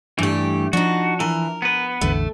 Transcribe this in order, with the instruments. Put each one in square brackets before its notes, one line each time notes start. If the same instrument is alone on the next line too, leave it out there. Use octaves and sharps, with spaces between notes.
[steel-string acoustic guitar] G2 G4 [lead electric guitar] E3 A3
[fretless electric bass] F3 [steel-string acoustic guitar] D4 D#4 [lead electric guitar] F#4
[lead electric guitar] E3 [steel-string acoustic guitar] A#4
[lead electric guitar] B3 B4
[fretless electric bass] A1 E2 D3 [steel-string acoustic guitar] A3